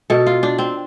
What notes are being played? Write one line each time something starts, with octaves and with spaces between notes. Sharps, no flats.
B2 A4
F4
D4
C4